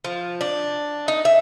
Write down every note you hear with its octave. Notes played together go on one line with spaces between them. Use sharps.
F3
D4
D#4
E5